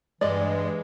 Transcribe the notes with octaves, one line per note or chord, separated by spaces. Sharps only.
G2 E3 G#3 D5 D#5